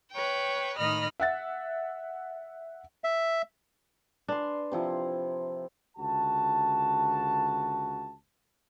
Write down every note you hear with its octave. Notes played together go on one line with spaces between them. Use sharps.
B4 C#5 G5
A2 D#3 D#5 B5 F6 A#6
E5 F#5 A6
E5
D4 B4 C6
C3 F3 E4
C#2 D3 F#4 A5